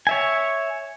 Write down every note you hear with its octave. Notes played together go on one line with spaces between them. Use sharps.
C#5 E5 G#5